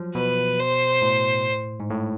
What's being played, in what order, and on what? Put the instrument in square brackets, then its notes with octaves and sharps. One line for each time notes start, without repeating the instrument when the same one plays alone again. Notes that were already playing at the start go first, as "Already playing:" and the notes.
Already playing: [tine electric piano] F3 F#3
[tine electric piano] B2 [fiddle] B4
[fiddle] C5
[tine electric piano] A2
G#2
A2